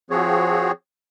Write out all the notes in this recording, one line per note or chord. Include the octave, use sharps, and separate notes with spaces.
F3 C4 F#4 G#4 C#5